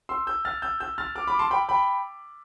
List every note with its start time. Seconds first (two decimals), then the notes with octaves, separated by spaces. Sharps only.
0.09 C6 E6
0.27 E6 G6
0.45 F6 A6
0.62 E6 G6
0.80 E6 G6
0.98 F6 A6
1.16 D6 F6
1.27 B5 D6
1.39 A5 C6
1.51 G5 B5
1.69 G5 B5